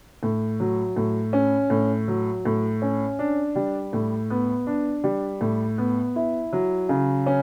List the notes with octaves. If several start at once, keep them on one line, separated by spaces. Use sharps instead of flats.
A2
F#3
A2
C#4
A2
F#3
A2
C#4
D4
G3
A2
B3
D4
G3
A2
B3
E4
F#3
C#3
C#4